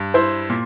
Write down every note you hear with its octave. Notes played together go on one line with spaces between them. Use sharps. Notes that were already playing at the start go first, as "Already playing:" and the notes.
Already playing: G2
E4 C5
A#2